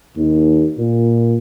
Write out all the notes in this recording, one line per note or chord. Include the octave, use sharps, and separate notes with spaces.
D#2
A#2